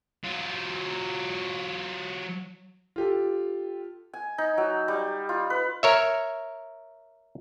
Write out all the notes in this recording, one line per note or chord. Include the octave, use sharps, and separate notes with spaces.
F#3 F4
F4 G4 A4
G#5
D#4
F#3
G3
F4
B4
A#4 C#5 E5